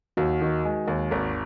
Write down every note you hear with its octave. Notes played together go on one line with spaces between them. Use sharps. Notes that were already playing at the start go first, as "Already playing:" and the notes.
D#2 F#4
D#3
G#3
D#2
G#1